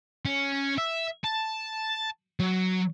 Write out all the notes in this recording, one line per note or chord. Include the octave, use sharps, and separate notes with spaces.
C#4
E5
A5
F#3